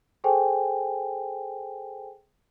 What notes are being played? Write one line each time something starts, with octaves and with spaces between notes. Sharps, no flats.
G#4 A4 C5 G5 G#5